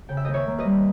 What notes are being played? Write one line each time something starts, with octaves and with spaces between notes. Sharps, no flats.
C#3 G5
E5
D#2 D#5 G5
C#5 E5
A#3
B4 D#5
G3